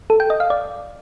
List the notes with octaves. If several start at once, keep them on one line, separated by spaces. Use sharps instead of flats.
A4
G5
D#5
F5
D5